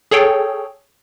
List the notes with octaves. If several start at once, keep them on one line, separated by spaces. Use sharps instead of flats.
G#4 A4 C#5 G5